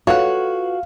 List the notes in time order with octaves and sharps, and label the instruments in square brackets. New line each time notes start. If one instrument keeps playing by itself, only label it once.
[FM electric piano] F4 A4 B4 [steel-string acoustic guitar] F#4 [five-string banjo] C#5 F#5 [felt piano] F5